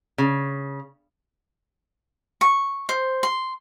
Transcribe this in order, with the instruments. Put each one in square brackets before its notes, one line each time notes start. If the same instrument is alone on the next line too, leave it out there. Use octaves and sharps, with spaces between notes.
[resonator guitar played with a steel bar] C#3
[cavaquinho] C#6
C5
C6